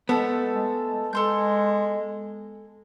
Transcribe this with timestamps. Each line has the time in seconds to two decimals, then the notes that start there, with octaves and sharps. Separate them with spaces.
0.09 G#3 A3 B3 A4
0.54 G#3
1.13 G#3 A4 C6 G6